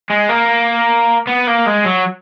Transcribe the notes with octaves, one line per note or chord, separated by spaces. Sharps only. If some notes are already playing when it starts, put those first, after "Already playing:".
G#3
A#3
B3
A#3
G#3
F#3